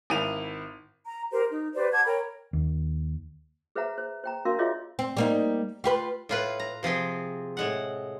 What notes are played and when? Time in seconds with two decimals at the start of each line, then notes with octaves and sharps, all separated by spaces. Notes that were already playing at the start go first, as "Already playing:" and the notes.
0.10 G#1 E4 D#7 F7
1.06 A#5
1.32 G4 A#4 C5
1.50 D#4
1.75 G4 B4 C5 D5
1.92 F#5 A5 D6 G#6
2.06 A#4 C#5 G5 B5
2.53 D#2
3.76 G#4 B4 C5 E5 F#5 A#5
3.98 C5
4.24 C5 G5 A#5
4.45 D4 F#4 A#4 F5 C6
4.59 F4 G#4 C#5 D#5 E5
4.99 C4
5.17 G3 A#3 D#4
5.84 F4 G4 B4
6.29 A2 F4 B4
6.60 A#5
6.83 C3 F3 C4 G#4
7.57 A2 G#3 F#5